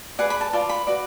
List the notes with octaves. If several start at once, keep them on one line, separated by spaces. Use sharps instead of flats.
G#4 B4 D5 F#5
B5
A5
F4 B4 D5 A5
B5
F#4 B4 D5